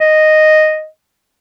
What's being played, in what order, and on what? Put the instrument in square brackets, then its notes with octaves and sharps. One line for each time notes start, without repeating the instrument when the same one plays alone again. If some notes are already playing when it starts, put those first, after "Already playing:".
[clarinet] D#5